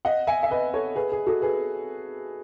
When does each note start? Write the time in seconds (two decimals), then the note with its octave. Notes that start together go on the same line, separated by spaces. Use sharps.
0.05 D#5 F#5
0.27 E5 G#5
0.43 E5
0.51 B4 D#5
0.74 A4 C#5
0.96 G#4 B4
1.12 G#4
1.26 F#4 A4
1.42 G#4 B4